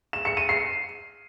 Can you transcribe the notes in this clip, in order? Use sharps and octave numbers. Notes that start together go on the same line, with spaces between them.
E7
C#7
D#7
C7